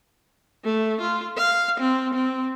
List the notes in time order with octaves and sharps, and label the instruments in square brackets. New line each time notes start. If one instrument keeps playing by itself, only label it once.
[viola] A3
F4
F5
C4
C4